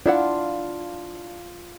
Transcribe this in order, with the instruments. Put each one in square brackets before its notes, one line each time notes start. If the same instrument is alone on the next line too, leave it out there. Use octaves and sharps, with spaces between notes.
[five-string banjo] D4 E4 F#5 [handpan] F4